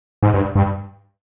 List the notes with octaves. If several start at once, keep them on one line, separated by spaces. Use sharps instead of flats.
G#2
G2
G2